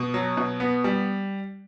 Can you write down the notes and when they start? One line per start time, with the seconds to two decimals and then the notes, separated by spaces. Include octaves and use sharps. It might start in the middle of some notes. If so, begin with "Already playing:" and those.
Already playing: B2
0.14 F#3
0.37 B2
0.60 B3
0.84 G3